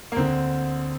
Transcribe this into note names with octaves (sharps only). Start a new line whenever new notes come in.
A#3
D2 D3 C4